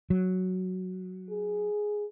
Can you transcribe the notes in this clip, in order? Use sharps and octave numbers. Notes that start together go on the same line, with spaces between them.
F#3
G#4